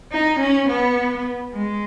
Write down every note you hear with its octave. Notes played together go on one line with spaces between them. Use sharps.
D#4
C#4
B3
G#3